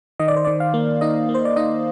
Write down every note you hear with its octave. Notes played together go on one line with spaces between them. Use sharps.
D#3 D#5
D5
C5
D#3 D5
F5
A#3
D#4 D#5
A#3
C5
D5
D#4 D#5